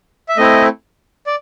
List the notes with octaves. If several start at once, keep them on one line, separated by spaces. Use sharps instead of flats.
E5
A3 C4 E4 D#5
D5